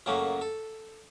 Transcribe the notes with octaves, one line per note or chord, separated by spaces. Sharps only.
F#2 A2 C#3 F#3 A#3
A4